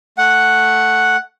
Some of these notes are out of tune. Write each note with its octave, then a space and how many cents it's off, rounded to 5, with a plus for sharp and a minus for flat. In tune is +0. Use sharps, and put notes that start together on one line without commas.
A3 +0 F#5 +0